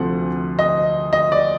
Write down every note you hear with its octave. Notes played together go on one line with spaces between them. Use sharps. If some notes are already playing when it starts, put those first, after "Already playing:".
Already playing: D2 C3 F3 A3 F#5
D#5
D#5
D5